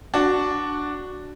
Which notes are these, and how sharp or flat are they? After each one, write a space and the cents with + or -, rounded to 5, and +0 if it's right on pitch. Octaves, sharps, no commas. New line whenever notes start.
D4 +0 F#4 +0